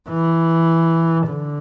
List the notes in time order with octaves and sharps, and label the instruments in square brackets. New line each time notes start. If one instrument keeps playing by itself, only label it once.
[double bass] E3
D3